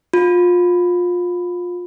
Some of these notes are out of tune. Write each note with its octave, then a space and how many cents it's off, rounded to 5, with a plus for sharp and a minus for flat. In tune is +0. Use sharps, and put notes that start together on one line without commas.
F4 +25